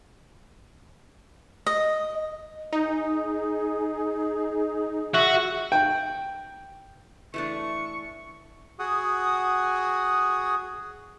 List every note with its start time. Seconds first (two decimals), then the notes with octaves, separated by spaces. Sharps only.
1.66 D#5
2.73 D#4 G#4
5.14 F#4 E5
5.72 G5
7.34 E3 A3 D4 C#6
8.79 F#4 G#4 F#5 D#6